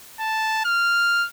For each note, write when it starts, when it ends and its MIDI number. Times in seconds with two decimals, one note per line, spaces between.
0.20 0.63 81
0.65 1.26 89